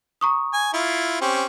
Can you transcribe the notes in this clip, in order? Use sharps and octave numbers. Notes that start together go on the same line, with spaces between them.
A#5 C#6 D#6
G#5
E4 F4
C4 C#4 G4